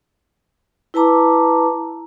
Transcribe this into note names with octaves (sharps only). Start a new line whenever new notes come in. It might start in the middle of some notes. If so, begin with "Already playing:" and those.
E4 B4 A5 A#5 D6